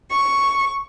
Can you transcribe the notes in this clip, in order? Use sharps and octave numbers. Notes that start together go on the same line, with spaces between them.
C#6